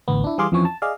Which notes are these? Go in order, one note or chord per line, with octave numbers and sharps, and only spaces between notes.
A1 D2 B3
D4 E4
E3 G3 G#4 F5 C6 D6
F2 E3 F3 C#4 C#5
A5
G#4 D5 D#5 F5